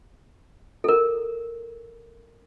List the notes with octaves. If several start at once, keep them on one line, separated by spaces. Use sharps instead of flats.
A4 A#4